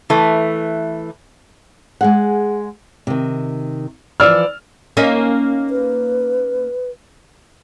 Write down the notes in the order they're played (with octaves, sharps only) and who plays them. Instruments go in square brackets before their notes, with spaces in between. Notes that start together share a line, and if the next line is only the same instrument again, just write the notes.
[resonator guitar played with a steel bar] E3 A3
[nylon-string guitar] G#3 G#4 F#5
C3 D#3
[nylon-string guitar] E3 F3 [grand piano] D5 E6 F6
[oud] A#3 C#4 D#4
[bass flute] B4